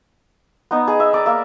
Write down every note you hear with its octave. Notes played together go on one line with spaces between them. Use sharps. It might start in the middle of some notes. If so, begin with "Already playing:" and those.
B3 D#4
G#4
E5
D5 A#5
A#3 E5